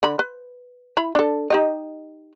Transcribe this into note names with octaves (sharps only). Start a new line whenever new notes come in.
D3 B5
B4
E4 B5
D4 A4
D#4 G4 D#5